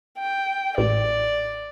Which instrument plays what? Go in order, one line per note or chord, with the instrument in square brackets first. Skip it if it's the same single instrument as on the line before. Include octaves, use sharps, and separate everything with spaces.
[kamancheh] G5
[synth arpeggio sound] A1 [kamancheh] D5